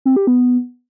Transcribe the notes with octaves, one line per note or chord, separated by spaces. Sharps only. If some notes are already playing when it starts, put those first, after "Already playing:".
C4
G4
B3